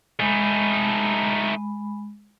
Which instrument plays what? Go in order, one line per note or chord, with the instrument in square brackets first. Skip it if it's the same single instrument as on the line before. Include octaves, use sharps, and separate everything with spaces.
[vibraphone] G#3 B5 [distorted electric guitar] A3 D#4